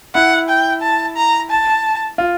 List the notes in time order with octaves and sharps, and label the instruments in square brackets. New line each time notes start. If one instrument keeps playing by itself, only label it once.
[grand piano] E4 [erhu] F#5
[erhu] G5
A5
A#5
A5
[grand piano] F4